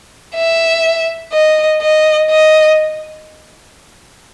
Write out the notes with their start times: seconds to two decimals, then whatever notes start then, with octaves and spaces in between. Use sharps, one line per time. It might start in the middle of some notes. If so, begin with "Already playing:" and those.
0.35 E5
1.33 D#5
1.81 D#5
2.30 D#5